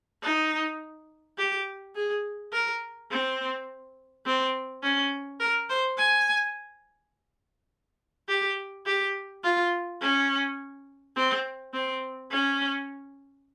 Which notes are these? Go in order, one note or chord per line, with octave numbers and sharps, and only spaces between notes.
D#4
G4
G#4
A#4
C4
C4
C#4
A#4
C5
G#5
G4
G4
F4
C#4
C4
C4
C#4